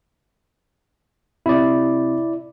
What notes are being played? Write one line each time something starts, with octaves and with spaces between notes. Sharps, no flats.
C3 E4 D5